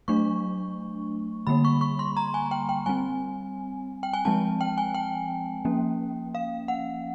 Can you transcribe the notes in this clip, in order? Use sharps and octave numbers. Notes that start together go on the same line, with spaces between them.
F#3 A3 D4 C#6
D3 G3 A#3 B5
C#6
C#6
C6
A#5
G#5
G5
G5
G3 C4 G#5
G5
G#5
F3 G#3 C4 A5
G5
G#5
G5
F3 A#3 C#4
F5
F#5